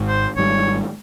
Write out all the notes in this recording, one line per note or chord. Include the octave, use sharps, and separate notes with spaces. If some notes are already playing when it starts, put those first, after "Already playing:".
Already playing: G#1 G#2
C5
G#1 G#2 G3 C#5